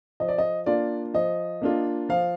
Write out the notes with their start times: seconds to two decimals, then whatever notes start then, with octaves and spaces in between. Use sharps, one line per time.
0.20 F3 D#5
0.28 D5
0.38 D#5
0.66 A#3 D4 F4 D5
1.14 F3 D#5
1.62 A#3 D4 F4
2.09 F3 F5